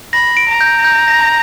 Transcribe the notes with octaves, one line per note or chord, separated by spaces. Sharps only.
B5 A#6
D7
A#5
G6
G6
A#6